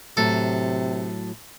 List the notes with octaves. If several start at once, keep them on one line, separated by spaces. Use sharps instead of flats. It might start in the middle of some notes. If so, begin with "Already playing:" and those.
A2 C3 F#3 A3 A4